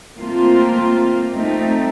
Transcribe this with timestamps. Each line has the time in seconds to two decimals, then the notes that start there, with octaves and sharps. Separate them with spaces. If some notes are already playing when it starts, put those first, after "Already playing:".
0.17 A3 A#3 C4 F4
1.35 A3 C4 D#4